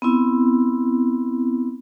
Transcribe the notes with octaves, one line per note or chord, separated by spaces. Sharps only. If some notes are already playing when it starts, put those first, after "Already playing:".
B3 C4 E4